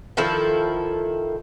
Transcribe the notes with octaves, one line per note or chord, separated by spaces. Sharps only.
D#3 F3 E4 A4